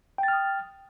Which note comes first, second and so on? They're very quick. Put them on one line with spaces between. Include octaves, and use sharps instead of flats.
G5 A6 F6 D#6